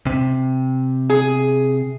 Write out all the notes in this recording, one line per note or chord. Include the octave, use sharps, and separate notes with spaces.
C3
G#4